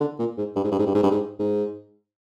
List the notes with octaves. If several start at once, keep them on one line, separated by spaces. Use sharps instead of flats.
D3
A#2
G#2
G2
G#2
G2
G#2
G2
G#2
G2
G#2
G#2